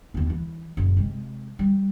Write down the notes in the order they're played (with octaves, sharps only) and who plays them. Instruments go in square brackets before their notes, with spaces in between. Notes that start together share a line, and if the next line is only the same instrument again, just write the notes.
[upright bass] D#2 B3
E3
F#1 A#2
C3 G#3
G3